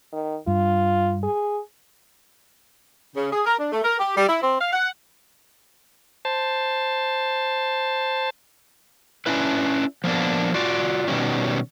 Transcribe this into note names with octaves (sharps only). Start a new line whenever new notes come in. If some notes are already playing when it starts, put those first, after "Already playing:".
D#3
G2 F4
G#4
C#3
G#4
A#4
D4
A3
A#4
G4
G3
E4
C4
F5
F#5
C5 A5
C#4 D4 E4 B4
F3 A#3 B3 D4
F4 F#4 D5
B2 D#3 G3 C#4